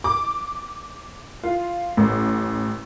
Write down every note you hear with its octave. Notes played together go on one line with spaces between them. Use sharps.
D6
F4
A1